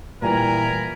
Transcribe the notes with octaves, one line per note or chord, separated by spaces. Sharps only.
A#2 E3 G3 A#4 G#5 A#5 B5